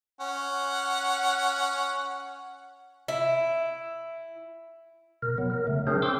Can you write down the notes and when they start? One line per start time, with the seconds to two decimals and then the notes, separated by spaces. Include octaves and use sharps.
0.20 C#4 F#5
3.08 E4
5.22 B2 A#4
5.38 F#3 B3
5.50 A#4
5.67 C#3 A3
5.87 F#3 C4 D4 G#4 A#4 C5
6.02 C4 C5 C6 D6 E6